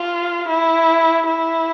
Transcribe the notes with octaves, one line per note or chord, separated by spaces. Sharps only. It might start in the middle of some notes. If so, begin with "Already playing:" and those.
Already playing: F4
E4
E4